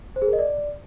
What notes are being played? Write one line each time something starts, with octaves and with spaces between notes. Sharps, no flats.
C5
G#4
A#4
D#5
D5